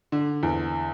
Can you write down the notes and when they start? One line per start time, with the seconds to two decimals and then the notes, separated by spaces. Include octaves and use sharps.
0.12 D3
0.43 E2